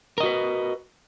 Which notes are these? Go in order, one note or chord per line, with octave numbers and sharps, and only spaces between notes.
F#4 A#4 B4 D#5